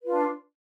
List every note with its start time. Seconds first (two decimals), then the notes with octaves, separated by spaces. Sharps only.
0.03 B4
0.06 F4
0.09 D4